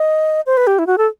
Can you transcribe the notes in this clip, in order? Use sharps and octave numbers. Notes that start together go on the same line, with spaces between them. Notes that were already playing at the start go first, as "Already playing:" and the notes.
Already playing: D#5
C5
B4
G4
E4
F#4
A4